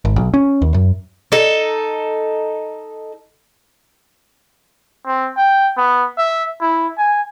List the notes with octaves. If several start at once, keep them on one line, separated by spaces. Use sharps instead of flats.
G#1
B1
C#4
D#2
F#2
D#4 A4
C4
G5
B3
E5
E4
G#5